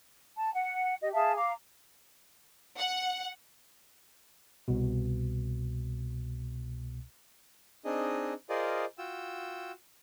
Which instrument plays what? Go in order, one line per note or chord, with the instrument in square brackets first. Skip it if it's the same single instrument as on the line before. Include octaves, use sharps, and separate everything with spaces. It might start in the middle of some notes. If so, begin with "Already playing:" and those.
[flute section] A5
F#5
G4 D#5
G#4 E5 F5 A5
F5 A#5 D6
[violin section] F#5
[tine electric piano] C2 B2
[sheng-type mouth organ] C4 D4 D#4 G#4 D#5
F4 G#4 A#4 C5 D5 D#5
F4 F#4 G5 E6